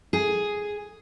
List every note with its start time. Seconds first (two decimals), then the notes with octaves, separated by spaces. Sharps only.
0.13 G#4